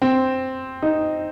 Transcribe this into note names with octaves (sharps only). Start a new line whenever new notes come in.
C4
D#4